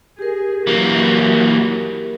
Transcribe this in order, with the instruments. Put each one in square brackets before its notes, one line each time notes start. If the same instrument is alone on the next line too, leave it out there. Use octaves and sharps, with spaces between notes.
[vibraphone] G4 A#4 [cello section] G#4
[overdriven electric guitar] E3 A#3 [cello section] F#3 E4 F#4